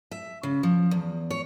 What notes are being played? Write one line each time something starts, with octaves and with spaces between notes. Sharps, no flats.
E5
C#3
F3
E2
C#5